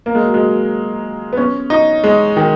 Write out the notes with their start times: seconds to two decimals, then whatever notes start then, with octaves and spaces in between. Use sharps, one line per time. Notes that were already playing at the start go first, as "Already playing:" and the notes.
0.06 A#3
0.15 G#3
0.24 F#3
0.34 G#3
1.33 B3
1.37 C#4
1.70 D#4
2.04 G#3
2.37 D#3